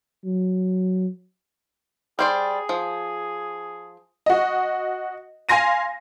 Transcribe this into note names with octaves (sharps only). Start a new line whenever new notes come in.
F#3
G3 G#4 C5 D5
F3
F#4 D#5
F5 G#5 C6 A#6 D#7